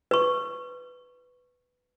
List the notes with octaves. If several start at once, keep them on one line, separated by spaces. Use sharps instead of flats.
B4 C#6